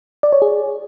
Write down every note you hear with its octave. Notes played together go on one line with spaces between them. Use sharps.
D5
C#5
G#4